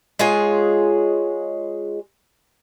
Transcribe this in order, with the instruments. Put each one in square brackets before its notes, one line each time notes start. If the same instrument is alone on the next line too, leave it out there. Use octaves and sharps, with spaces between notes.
[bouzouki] G#3 F4 G#4 C#5